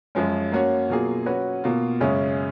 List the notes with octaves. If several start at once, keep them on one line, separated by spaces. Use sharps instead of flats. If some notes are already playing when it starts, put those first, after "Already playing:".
F#2 F3 G#3 C#4
A#3 C#4 F#4 C#5
B2 F#3 A#3 F4 G#4
F#3 C#4 F#4 B4
B2 A#3 F4
F#2 C#3 G#3 C#4 G#4